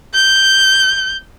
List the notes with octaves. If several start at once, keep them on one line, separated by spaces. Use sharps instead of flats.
G6